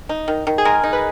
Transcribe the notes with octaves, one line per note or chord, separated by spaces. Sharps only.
D#4
D#3
D#3
G#4
G#3 A#4
D#4
B4